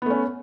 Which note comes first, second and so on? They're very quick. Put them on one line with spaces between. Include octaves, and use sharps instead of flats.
B3 A3 C#4